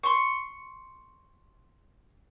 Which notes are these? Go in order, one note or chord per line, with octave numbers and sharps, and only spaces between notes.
C6 C#6